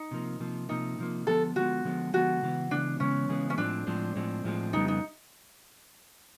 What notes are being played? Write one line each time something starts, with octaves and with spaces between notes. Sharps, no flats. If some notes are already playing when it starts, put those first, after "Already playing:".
Already playing: D#4
C3 F3 A#3
C3 F3 A#3
C3 F3 A#3 D#4
C3 F3 A#3
D3 F3 G#3 B3 A4
D3 F3 G#3 B3 F#4
D3 F3 G#3 B3
D3 F3 G#3 B3 F#4
C#3 E3 G#3 B3
C#3 E3 G#3 B3 D4
C#3 E3 G#3 B3 C#4
C#3 E3 G#3 B3
C#4
A2 F3 G#3 C4 D4
A2 F3 G#3 C4
A2 F3 G#3 C4
A2 F3 G#3 C4
F2 C#3 G3 B3 D#4
D#4